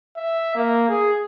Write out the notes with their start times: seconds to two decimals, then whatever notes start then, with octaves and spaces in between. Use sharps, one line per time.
0.17 E5
0.55 A#3
0.89 G#4